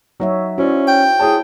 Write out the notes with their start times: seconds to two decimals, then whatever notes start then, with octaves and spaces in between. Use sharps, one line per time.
0.20 F#3 D#4 C#5 E5
0.58 C#4 E4 F#4 C5 D5
0.88 G5
1.19 E4 G#4 C#5 A5